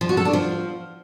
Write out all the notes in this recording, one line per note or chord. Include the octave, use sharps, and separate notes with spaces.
F3
F#4
A4
D4
F3